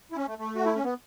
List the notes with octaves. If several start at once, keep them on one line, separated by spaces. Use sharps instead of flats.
E4
C#4
A3
A3
F#4
E4
C#4
B3